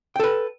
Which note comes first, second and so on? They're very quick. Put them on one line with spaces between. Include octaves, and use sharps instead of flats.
G5 A4 B4